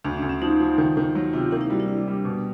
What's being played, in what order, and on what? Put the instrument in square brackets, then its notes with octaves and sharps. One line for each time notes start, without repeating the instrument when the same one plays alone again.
[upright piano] D2 [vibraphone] D4
[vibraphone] C#4
[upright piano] D2
[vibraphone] C#4
[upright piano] F3 [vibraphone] D#4
[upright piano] F3
D#3
D#3
F#3
[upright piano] C3 [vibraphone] F4
[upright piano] A#3 [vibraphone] D#4
[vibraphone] E4
[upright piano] G3 [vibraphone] F#4
[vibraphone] E4
[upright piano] G3 [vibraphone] D4
[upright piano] G3
B2